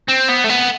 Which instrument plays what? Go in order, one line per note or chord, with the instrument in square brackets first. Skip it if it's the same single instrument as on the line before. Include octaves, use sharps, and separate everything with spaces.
[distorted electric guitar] C4
B3
A3
B3